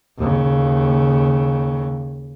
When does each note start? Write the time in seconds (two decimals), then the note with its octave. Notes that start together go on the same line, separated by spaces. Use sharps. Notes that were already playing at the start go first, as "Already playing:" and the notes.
0.18 D#2 C#3